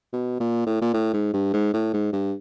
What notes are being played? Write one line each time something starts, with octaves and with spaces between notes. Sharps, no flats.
B2
A#2
A2
A#2
A2
G#2
G2
G#2
A2
G#2
G2